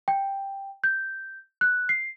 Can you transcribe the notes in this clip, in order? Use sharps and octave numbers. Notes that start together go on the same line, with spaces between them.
G5
G6
F#6
C7